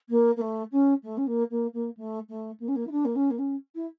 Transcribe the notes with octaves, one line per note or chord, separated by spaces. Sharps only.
A#3
A#3
A3
C#4
A3
C#4
A#3
A#3
A#3
A3
A3
A#3
C#4
A#3
E4
D4
A#3
C#4
A#3
C#4
E4